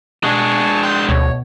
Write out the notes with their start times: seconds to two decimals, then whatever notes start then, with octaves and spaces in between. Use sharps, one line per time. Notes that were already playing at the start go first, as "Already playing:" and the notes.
0.24 B2 G#3 D4 G#5 A5 C#6
0.83 G5 C6 F#6 G6
1.09 D2 B2 C#5